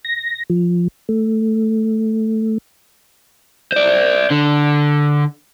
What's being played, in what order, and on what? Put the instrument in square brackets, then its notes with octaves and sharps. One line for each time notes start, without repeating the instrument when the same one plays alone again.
[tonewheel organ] A#6
F3
A3
[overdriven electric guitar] C5 D5
D3